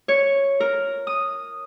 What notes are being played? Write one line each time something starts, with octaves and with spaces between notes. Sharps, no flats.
C#5
A#4
D#6